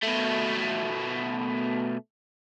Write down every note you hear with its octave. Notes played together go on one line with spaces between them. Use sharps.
B2 A3